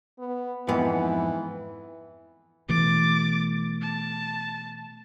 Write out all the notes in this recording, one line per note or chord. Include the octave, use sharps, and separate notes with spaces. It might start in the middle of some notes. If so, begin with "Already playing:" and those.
B3
F2 G#2 E3 B3
B2 E3 A3 D6 A6
A5